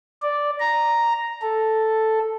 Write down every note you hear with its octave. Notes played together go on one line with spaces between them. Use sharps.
D5
A#5
A4